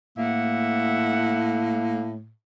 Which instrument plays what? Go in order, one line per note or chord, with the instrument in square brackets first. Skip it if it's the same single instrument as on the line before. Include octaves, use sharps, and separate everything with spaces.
[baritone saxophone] A2 [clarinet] A#3 [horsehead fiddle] E5 F#5